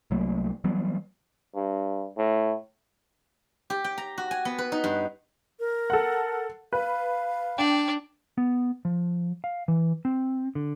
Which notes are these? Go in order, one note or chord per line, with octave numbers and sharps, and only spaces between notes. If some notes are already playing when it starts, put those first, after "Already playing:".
C2 F#3 A3 A#3
E3 F#3 G3 B3
G2
A2
G4
G5
A#5
F#4
G#5
B3
B4
D#4
G2
A#4
A4 F#5
B4 F5
D4 G5
B3
F3
F5
E3
C4
D3